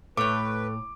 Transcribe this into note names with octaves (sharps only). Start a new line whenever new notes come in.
A2 A3 B4 C#5 G5 D6